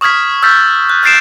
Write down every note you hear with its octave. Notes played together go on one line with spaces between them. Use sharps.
C#6 D#6 F6 G#6 B6
E6 F6 G6 A6 B6
F#6
F6 G6 A6 C7 D7 E7